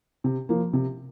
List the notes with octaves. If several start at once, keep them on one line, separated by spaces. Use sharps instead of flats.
C3
F3 A#3
C3